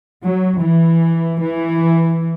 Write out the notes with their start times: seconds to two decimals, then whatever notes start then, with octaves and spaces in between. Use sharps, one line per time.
0.23 F#3
0.61 E3
1.41 E3